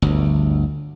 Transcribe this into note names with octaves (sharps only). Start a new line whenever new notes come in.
G1 D2